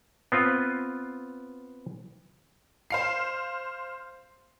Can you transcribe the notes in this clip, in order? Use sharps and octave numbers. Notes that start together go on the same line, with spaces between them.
B3 C4 F4 B4
C5 F5 C7